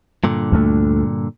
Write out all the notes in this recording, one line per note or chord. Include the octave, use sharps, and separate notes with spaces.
G2 A#2 D3
D2 A3